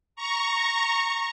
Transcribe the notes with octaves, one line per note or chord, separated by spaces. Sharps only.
A#5 C#6